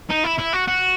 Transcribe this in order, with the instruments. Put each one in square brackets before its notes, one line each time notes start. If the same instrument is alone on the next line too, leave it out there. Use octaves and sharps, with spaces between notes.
[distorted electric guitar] D#4
E4
E4
F#4
F#4